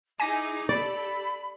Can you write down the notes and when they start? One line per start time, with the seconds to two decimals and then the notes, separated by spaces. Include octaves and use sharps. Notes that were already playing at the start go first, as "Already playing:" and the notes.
0.20 D#4 E4 G#4 G#5 D6 A#6
0.69 G4 A4 D5 B5